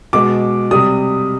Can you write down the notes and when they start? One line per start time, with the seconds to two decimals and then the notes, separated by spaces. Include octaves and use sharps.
0.13 B2 G#3 D6
0.71 C3 G3 D#6